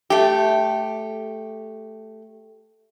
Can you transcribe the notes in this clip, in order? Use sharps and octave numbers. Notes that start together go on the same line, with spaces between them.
A3 G4